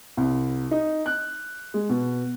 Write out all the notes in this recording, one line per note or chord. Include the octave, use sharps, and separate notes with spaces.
C2
D#4
F#6
G#3
B2